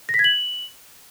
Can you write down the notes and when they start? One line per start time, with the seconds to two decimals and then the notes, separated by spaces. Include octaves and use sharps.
0.09 A#6
0.14 B6
0.19 G#6
0.24 F#7